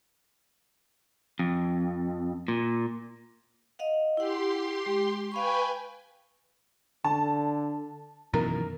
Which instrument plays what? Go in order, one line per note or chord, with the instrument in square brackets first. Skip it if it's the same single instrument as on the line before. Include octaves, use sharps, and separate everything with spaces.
[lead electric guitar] F2
A#2
[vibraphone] D#5 F5 F#5
[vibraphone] E4 F#5 [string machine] G4 C6
[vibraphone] G#3
[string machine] B4 G5 G#5 [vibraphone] F5 B5 C#6
[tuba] D3 [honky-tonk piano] A5
[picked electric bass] F#2 B2 E3 [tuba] D#3 [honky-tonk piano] A#4